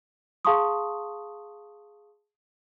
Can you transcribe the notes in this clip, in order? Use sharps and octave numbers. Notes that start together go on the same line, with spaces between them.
G#4 F5 A5 C6 C#6 D#6